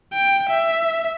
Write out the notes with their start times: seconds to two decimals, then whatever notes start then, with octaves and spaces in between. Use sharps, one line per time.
0.13 G5
0.49 E5